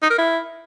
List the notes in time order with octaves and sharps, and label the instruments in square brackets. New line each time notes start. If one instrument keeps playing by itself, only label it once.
[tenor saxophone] D#4
A#4
E4